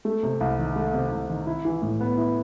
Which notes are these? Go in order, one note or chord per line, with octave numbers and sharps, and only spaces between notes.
A3
C3
C2
D#3
A3
C3
C2
D#3
E4
E3
A2
B3
E4